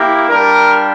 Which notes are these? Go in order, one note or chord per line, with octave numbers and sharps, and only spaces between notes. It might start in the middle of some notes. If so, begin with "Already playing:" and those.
Already playing: A#3 E4 G4
G3 D4 F4 A#4